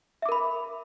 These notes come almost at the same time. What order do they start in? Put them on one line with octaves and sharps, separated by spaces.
E5 D6 A#4 B5